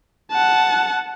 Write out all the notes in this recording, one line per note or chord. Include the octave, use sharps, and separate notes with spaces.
F#5 A5